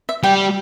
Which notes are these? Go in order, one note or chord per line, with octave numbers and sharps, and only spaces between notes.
E5
G3 G5